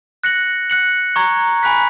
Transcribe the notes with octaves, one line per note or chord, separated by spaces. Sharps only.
F#6 A#6 C#7 F#7
F#6 C#7 F#7
A#5 C#6 G#6
G#5 B5 F#6 B6